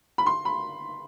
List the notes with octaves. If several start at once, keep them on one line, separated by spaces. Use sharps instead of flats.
B5
C6
B5